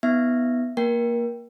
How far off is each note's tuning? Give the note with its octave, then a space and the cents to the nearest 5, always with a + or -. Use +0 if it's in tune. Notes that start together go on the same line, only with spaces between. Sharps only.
B3 +0 D#4 +40 E5 +0
A#3 +0 A#4 +30 G5 +0